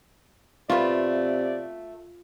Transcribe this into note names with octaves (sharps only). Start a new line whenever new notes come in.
C3 A3 B3 F4 D5